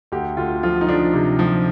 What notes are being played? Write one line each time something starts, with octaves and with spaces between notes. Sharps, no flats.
D2 G4
D2 F4
F3 F4
D#4
F3 D4
C3
F3